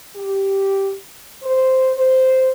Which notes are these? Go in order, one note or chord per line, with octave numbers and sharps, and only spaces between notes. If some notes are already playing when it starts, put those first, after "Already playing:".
G4
C5
C5